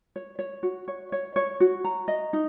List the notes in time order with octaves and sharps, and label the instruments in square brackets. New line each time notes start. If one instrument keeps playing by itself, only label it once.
[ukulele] C#5
C#5
F#4
C#5
C#5
C#5
F#4
A#5
D#5
D#4